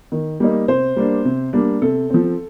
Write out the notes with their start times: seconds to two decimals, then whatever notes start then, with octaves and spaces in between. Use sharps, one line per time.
0.12 D#3
0.40 G3 A#3 D#4
0.68 C3 C5
0.96 G3 A#3 D4
1.25 C3
1.53 G3 A#3 D4
1.82 C3 A4
2.10 F3 C4